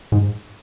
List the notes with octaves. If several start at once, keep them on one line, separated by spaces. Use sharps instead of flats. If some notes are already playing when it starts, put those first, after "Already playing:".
G#2